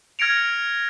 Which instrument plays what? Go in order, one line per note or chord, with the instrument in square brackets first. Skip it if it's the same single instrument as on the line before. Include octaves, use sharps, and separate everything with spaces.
[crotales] F6 G#6 A#6 C#7 D7 F7